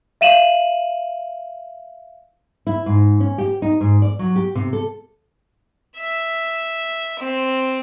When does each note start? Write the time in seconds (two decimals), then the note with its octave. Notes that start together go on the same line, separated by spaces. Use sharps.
0.21 E5 F5 D#7 E7 F#7
2.67 E4
2.86 G#2
3.20 C#4
3.38 G4
3.62 D#4
3.81 G#2
4.02 D5
4.19 F#3
4.36 G4
4.55 C3
4.73 A4
5.96 E5
7.19 C4